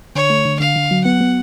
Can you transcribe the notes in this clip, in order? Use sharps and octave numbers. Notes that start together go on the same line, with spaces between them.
D3 C#5
A3
D3
D3 F5
D3
F#3
B3 F#5
B3